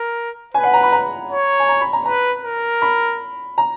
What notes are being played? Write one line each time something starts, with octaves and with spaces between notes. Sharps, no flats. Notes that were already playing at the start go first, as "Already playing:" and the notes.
Already playing: A#4
B4 G#5
F#5
A#5
B5
A#5
C#5
G#5
A#5
B5
A#5
B4 A#5
A#4
B5
A#5